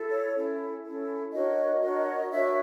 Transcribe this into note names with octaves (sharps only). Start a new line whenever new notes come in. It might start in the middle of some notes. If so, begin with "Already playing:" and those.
Already playing: E4 A4
C#5
C#4 E4 A4
C#4 E4 A4
D4 F#4 A#4 C#5 D#5
D4 F#4 A#4 C#5
D4 F#4 A#4 C#5 E5